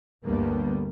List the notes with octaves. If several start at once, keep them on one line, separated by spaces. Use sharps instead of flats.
G1 D2 G2 G3 A#3 B3